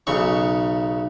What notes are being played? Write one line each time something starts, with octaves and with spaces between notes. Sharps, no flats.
B1 C#3 C#6